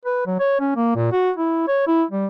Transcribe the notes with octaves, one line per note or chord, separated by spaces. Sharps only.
B4
F#3
C#5
C#4
A#3
A#2
F#4
E4
C#5
E4
G3